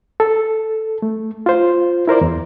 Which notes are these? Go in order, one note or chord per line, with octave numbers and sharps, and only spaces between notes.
A4
A3
F4 C5
E4 A#4 C5 D5
E2